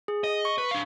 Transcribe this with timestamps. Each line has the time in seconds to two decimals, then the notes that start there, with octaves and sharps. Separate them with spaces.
0.08 G#4
0.24 D#5
0.45 C#6
0.58 B4
0.71 D4 F5